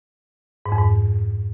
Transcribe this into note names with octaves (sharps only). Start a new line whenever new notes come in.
G#2
F2
G#2